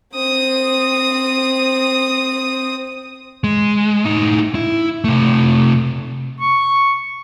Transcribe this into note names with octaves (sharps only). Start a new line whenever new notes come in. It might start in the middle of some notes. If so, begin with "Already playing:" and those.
C4 D#6
G#3
A2 D#4
E4
C3 A3
C#6